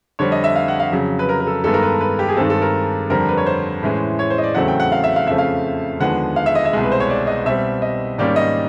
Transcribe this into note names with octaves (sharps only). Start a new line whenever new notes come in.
F2 D3 G3 C4 C#5
D#5
E5
F5
F#5
F5
F2 C#3 F#3
B4
A#4
A#4
A4
G2 D#3 G#3 B3 A4
A#4
B4
B4
G4
G#4
G2 D#3 G#3 C4 A4
A4
A#4
F2 D3 G3 C4 A#4
B4
C#5
C5
A2 E3 G#3 C#4
C#5
C5
D#5
D5
E2 C#3 F#3 A3 C4 F#5
G5
F#5
F5
E5
F5
F2 C#3 F3 A3 C4 E5
F5
D#2 D3 F3 G#3 B3 F#5
F5
E5
D#5
E5
C2 B2 G#3
B4
C5
C#5
D5
D#5
B2 G3 C4 E5
D#5
G#2 D#3 G3 A#3 C#4 D5
D#5